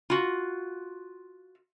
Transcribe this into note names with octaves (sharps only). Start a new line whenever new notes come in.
F4 F#4